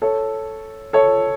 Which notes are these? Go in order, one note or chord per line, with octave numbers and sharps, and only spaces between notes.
A4 C#5
A4 C#5